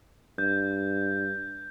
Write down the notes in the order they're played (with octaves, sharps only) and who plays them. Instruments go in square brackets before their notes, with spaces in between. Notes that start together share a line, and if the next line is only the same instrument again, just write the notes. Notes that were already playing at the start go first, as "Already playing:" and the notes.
[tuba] G2 [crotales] G6